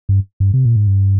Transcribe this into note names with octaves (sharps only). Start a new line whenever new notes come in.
G2
G2
C3
A#2
G#2
G2